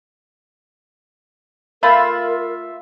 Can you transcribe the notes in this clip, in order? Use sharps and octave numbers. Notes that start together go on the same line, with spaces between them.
A3 F4 A#4 E5 B5